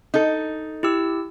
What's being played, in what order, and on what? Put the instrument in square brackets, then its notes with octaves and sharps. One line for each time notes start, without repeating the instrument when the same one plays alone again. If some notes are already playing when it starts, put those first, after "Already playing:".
[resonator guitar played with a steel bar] D#4 A4
[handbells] E4 G4 E6